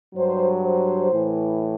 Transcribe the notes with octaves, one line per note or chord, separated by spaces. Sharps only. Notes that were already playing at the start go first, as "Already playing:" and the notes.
G2 F#3 C5
C5
A2 E3